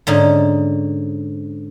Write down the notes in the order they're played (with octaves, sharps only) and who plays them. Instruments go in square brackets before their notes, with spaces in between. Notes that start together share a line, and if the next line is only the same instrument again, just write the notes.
[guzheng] G#2 D3 C#4 D#4